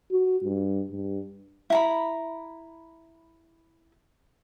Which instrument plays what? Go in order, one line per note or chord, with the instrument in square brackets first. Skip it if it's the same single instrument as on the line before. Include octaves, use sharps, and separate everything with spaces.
[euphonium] F#4
G2
G2
[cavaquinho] E4 A#5 B5